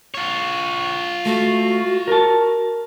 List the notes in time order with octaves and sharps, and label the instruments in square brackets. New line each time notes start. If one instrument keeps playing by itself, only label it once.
[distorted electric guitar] F4 C#5
[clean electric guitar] A3 [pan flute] F#4
[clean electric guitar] A#4 A5